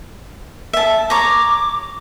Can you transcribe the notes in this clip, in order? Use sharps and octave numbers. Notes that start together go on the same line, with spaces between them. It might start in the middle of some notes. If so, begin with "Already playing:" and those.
E5 A5
C#5 A#5 D6